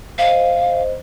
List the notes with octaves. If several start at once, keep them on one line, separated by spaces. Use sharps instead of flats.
C5 D#5 F5